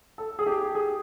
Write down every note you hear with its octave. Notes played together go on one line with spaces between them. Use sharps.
A4
G#4
G4
G#4